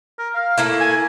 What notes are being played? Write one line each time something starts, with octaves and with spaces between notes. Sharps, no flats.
A#4
F5
A3 A#3 E4
G#5